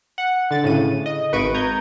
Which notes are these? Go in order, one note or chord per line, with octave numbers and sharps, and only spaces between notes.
F#5
D3 A6
A2 C#3 D#7
D#5
G#1 B4 C#6 D7 D#7
A#5 G6 G#6